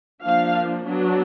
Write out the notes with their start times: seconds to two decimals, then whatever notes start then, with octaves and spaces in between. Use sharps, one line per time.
0.24 F3 A#3 D4 F5
0.84 F#3 B3 D4